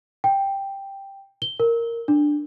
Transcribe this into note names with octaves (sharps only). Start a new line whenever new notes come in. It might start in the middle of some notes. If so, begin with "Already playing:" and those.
G5
G7
A#4
D4